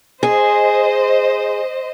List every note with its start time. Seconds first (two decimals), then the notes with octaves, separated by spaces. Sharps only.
0.23 G#4 C5 D#5